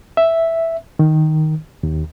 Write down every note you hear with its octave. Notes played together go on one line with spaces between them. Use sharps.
E5
D#3
D#2